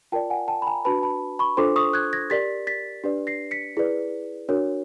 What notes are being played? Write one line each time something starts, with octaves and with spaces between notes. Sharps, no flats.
F4 A#4 D5 G5 A5
F#5 G#5
G5 A5
B5
G#5 A#5
D4 F#4 B4 A5 B5
A5 B5
B5 C#6
D4 F4 A4 C5 C6 D6
C#6 D#6
F#6 G#6
G#6 A#6
G4 A#4 D5 A6 B6
A6 B6
D4 G4 B4 D5
A#6 C7
B6 C#7
E4 G#4 B4 D5
D4 F#4 A#4 C#5